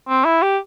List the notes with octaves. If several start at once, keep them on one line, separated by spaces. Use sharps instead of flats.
C4
E4
G4